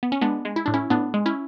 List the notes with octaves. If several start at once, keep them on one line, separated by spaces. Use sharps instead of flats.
B3
C#4
G#3 B3 D4
G#3
E4
A2 D4
C#4 E4
A2 B3 D4
G#3
C#4 E4